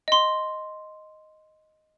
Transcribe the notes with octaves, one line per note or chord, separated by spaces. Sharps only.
D#5 C6